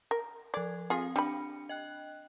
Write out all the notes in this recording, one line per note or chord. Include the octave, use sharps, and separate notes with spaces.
A#4
F3 A4 D5 G#6
C4 F4 G#4 F5
G3 D4 B5 C#7
D#5 G5 F#6